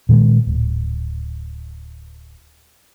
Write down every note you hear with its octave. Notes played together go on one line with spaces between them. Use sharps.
A#2 D#3 E3 G#3
D1